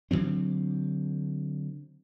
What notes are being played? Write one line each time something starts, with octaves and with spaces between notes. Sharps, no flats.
D3 F3 F#3 C4